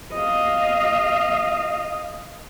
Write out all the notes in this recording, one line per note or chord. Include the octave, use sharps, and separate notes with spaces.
D#5 F5